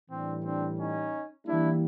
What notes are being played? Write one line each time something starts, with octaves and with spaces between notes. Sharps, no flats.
A2 E3 G3 C4 D4
C4 D4
C#4 D#4
E3 G3 A#3 D4 E4